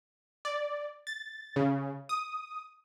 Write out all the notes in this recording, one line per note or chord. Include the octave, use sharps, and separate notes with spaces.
D5
A6
C#3
D#6